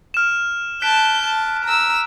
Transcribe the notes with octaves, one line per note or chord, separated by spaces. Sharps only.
F6 E7
A5 F#6 G6 B6 D7
A5
A#5 E6